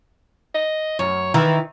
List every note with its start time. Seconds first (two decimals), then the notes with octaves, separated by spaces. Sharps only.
0.54 D#5
0.99 F#2 C#5
1.34 D#3 E3 E4